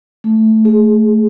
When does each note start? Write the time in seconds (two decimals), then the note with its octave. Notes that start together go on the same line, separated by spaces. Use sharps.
0.24 A3
0.65 G#4